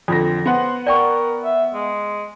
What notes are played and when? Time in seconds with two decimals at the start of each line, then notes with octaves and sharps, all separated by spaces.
0.08 F2 D3 A#6
0.46 B3 C5 F#5
0.87 A#4 D5 G5 C#6
1.44 E5
1.74 G#3